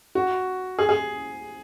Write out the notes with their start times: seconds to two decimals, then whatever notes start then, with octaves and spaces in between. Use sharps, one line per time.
0.15 F#4
0.79 G#4
0.89 G#4